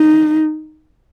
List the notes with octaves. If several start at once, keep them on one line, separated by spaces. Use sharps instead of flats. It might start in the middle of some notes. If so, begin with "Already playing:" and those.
Already playing: D#4